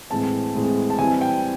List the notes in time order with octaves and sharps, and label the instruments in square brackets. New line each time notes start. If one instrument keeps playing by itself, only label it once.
[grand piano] A2 E3 G#3 C4 A5
A2 E3 G#3 C4
A5
E3 G3 C4 E4 G#5
G5